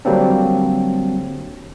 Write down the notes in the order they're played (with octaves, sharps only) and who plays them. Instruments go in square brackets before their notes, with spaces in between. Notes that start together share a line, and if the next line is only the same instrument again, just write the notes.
[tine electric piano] D3 F#3 G3 A#3 C4 D4